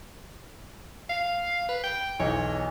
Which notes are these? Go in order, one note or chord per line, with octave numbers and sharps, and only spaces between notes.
F5
B4
G5
B1 E2 C#5